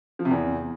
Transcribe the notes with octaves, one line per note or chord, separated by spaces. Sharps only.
F3
C3
E2